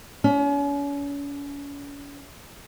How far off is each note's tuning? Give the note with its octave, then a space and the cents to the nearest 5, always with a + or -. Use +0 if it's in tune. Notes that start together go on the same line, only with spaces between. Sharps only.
C#4 +40